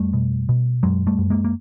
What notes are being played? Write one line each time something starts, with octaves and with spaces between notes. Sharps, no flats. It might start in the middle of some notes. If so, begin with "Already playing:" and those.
Already playing: F2 G3 A3
B2
B2
F#2 F#3 G#3
G3 A3
F#2
G#3 A#3
A#3